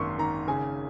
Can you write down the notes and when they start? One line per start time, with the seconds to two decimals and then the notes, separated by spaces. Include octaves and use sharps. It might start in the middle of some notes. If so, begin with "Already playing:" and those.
Already playing: G#1 F#2 A#3 C6 C#6
0.19 D#3 A#5
0.47 C#3 G#5